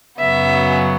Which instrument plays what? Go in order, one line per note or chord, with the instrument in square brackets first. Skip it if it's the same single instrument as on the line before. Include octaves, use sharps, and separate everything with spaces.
[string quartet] F#2 C#3 F#3 B3 E5